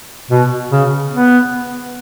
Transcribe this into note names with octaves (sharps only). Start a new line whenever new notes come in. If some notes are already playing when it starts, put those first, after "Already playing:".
B2
C#3
B3